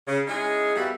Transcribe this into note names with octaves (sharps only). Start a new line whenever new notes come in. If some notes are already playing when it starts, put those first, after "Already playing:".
C#3
G#3 C#4 D#4 E4 G#4
E2 G3 A#3 F#4 B4 E5